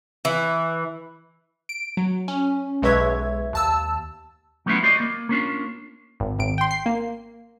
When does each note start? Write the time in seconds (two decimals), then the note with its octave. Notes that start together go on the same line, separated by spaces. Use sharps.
0.25 E3
1.69 D7
1.97 F#3
2.28 C#4
2.82 B1 G#3 B4 C#5 E5 G#6
3.53 D#2 A5 E6
4.66 F#3 A3 B3 C#4 E4 F4
4.83 F#4 C5 D5 D#5
5.00 A#3
5.29 A#3 C#4 D4 F4
6.20 G#1
6.39 G#1 D7
6.58 G5 C6
6.71 C7
6.86 A#3